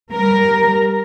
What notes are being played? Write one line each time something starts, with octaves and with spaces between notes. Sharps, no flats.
G3 A#4